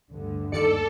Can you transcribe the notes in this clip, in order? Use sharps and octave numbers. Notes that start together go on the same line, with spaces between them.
D2 G2 D3
D#2 A4 D5 C#7